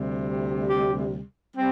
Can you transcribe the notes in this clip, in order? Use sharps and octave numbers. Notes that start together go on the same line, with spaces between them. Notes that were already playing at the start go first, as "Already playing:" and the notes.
Already playing: D2 C3 G3
G4
G3 C4